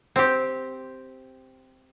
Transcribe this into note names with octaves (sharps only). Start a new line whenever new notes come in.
C4 G4